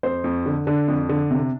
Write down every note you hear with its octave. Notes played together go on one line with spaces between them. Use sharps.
F2 C5
F2
D3
D3 D4
F2
D3
C3